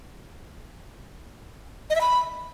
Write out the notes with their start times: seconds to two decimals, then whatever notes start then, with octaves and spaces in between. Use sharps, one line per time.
1.90 D#5
1.95 E5
2.01 B5